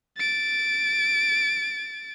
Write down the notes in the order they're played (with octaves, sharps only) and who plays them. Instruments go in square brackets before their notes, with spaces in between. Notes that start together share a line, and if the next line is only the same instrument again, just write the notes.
[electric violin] A6 D7